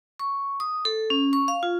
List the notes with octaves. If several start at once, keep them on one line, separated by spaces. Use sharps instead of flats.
C#6
D#6
A4
C#4
C#6
F5
F4